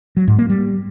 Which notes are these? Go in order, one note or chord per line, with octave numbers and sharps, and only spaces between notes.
F#3
G#2
A#3
G3